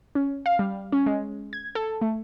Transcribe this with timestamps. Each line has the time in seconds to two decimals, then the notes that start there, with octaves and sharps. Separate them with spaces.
0.15 C#4
0.46 F5
0.59 G3
0.92 C#4
1.06 G#3
1.53 G#6
1.75 A4
2.02 A3